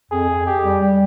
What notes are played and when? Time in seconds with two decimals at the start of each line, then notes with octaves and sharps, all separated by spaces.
0.11 F2 G#4
0.30 F2
0.47 F2 G4
0.64 G3
0.81 G3